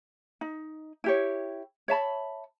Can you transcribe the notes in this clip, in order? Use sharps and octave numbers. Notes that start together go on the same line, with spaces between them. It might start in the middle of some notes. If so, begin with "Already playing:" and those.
D#4
E4 G4 C#5
C#5 E5 A5 B5